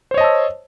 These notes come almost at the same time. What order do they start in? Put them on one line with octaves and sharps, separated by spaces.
C5 C#5 D#5 A5 E6